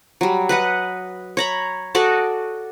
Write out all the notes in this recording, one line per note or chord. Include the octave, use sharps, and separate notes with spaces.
F#3 G3
B4 D#5 F#5
C#5 A#5 B5
F#4 A4 D5 D#5